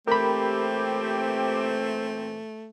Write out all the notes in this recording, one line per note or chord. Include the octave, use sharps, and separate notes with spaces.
A#2 E3 A3 C4 G4 A#4 B5